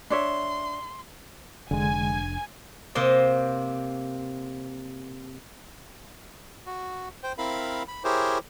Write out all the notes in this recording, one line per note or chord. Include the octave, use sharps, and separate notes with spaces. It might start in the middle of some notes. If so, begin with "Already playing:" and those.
D4 C#5 E5 C6
F1 D3 G#3 D4 G#5
C3 A#3 C5 D#5
F#4
C5 G5
C4 E4 A#4 F5 B5
B5
E4 G4 G#4 A#4 C5 C#5